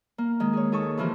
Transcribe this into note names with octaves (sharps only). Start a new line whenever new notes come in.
A#3
D#3 G#3
G#4 C#5
D#2 G#4 A4 C#6
C3 E3 F3 A#3 G4